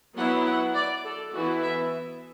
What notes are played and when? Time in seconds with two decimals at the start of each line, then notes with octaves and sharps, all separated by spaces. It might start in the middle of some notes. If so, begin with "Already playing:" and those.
0.16 F#3 B3 E4 F#5
0.45 F#5
0.75 D5
1.04 A4
1.33 E3 B3 E4 F#4
1.63 E5